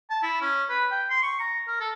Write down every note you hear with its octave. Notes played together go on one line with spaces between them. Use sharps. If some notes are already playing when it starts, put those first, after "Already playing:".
A5
E4
C#4
B4
G5
C6
C#6
A#5
A#4
A4